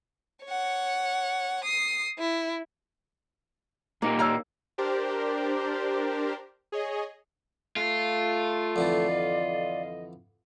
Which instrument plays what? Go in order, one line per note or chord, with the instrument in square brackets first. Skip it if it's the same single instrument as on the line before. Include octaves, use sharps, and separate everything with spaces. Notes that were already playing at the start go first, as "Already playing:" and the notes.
[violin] C#5 F#5
D#6 C7
E4
[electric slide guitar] A#2 D#4 G4 [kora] A#3
[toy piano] C#5 D5 E6 [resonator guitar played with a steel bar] F5 A#5
[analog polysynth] D4 G4 A#4 C5 D5
G#4 C#5 D#5
[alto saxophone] A3 [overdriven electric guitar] F4
[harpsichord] F2 D3 E3 [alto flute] D5
[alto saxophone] D#5